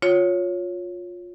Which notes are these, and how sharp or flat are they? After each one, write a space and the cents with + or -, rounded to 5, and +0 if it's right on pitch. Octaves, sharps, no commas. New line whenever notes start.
F4 +20 C#5 +0